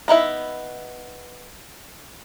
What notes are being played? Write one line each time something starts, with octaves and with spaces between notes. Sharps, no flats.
B3 D#4 E4 E5